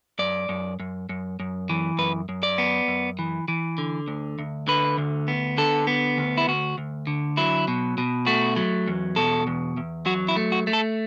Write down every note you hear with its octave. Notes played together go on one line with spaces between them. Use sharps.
F#2 D5
F#2
F#2
F#2
F#2
E3
F#2 B4
F#2
D5
B3
F#2
E3
E3
D3
D2
D2
D3 B4
D2
B3
D3 A4
B3
D2
E4
D2 F#4
D2
D3
F#3 E4
B2
B2
A3 F#4
F#3
E2
B2 A4
E2
E2
F#3 F#4
E4
A3
F#4
A3
A4